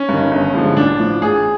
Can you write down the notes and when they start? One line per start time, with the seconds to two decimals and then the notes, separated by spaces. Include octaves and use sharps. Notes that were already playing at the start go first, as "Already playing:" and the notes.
Already playing: C#4
0.09 G2 D#3
0.31 G1
0.54 G2 D3 F3 G#3
0.77 A1 D4
0.99 A2 F3
1.22 A1 G#4